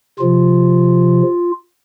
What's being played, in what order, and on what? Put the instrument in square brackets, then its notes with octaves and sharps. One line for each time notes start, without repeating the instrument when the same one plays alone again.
[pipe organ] C3 F3 F4